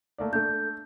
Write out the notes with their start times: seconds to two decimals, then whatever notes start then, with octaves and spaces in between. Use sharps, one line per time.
0.18 A3 A#3 D5
0.33 A3 D4 A4 G6